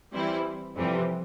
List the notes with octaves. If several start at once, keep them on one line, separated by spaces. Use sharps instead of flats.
E3 G3 C4 E4
F2 C3 E3 G3 C4